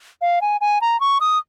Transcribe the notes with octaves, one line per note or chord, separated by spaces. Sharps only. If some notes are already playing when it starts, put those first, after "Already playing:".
F5
G#5
G#5
A#5
C#6
D#6